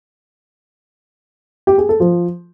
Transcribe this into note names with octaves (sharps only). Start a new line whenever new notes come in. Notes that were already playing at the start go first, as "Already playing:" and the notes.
G4
G#4
A4
F3